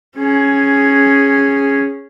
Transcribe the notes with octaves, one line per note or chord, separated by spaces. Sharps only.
C#4 G#4